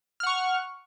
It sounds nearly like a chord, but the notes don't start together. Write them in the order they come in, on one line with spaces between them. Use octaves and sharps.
F6 F#5 C#6